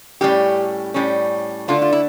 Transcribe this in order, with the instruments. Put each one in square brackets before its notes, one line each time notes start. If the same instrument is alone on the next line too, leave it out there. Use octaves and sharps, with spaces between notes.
[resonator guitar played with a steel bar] A2 G3 C#4 G4
A2 G3 C#4
D3 A3 D4 F4
F4
E4